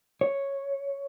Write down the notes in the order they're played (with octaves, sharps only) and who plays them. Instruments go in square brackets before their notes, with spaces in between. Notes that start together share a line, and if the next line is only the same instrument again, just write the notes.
[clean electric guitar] C#5